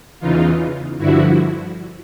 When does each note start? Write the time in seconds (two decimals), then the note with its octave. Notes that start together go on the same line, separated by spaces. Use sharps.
0.20 E2 C#3 E3 D#4 F4
0.98 G2 D3 F3 E4 F#4